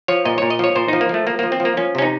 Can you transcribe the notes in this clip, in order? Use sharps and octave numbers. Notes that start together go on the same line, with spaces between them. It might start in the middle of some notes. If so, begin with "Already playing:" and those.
F3 C#5
A#2 D#5
A#2 C#5
D#5
F3 C#5
A#2 C5
F3 D#4
A#3
F3 A3
F3 A#3
F3 A#3
C4
F3
A#3
F3 C#4
C3 C#4
D#4